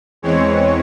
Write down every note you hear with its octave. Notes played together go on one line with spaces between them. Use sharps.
E2 E3 G#3 C4 C#5